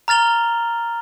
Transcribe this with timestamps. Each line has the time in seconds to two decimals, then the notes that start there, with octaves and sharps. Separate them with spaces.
0.08 A#5 F6 A6 F7 G7